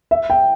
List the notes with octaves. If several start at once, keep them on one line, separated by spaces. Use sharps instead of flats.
E5
G5